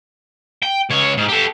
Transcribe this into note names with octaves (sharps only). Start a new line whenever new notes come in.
G5
C#2 C#5
G#2
G4 A4